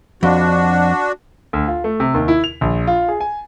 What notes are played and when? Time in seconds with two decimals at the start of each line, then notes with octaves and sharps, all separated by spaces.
0.23 F2 D4 F#4
1.53 D2
1.68 F4
1.84 A3
2.00 C3
2.14 D#2
2.28 E4
2.44 F7
2.61 A#1
2.87 F4
3.08 G#4
3.21 G#5